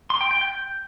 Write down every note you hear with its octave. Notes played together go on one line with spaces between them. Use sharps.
C6
G5
G5
G6